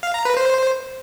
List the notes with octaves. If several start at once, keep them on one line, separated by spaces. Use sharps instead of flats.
F5
A#5
B4
C5